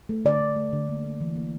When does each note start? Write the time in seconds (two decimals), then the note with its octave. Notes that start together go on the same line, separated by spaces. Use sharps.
0.09 A3
0.25 D3 D5
0.40 D3
0.56 A3
0.73 D3
0.89 A#3
1.04 A#3
1.21 E3
1.36 A#3